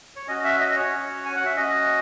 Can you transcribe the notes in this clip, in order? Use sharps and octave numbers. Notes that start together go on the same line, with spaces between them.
C#5
C#4 F#4 D#5
E5
D#5
D#5
C#5
C#4 F#4
G#5
F#5
E5
C#4 F#4 D#5